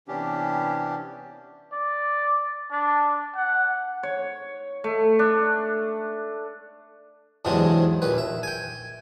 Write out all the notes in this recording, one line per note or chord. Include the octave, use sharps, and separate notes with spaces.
C3 E3 B3 C#4 D4 G4
D5
D4
F#5
C#5
A3
D4
E2 G#2 C3 F#3 G#3 D4
A#1 D#2 B4
E5
G5 G#5